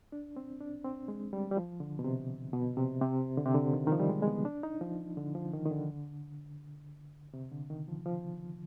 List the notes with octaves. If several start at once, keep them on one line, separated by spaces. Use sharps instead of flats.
D4
C4
D4
C4
G#3
G3
G3
F3
D3
B2
C3
B2
C3
C3
D3
C3
D3
D#3
D#3
F3
G3
G#3
G#3
B3
D4
D#4
F3
D3
F3
D#3
D#3
D3
C3
D3
D#3
F3
F3